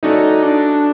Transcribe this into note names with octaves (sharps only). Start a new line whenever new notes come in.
A3 C#4 D#4 F#4 A4 D5
D4